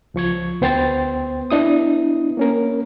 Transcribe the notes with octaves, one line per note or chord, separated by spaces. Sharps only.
C#2 F3 C#6 G#6
D2 B3 C5 G5 C6 A6
B3 D4 E4 D#6
A#3 C#4 A#4